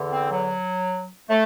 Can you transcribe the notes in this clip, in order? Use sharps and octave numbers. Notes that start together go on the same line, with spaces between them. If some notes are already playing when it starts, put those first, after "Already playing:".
Already playing: E2 D3
C4
F#3
A3